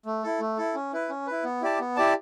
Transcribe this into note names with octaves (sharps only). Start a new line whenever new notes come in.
A3
E4 A4
A3
E4 A4
C#4
E4 B4
C#4
E4 B4
B3
E4 G4 D5 A5
B3
E4 G4 D5 A5